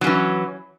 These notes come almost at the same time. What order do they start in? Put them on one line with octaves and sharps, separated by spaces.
F#3 C#4 E3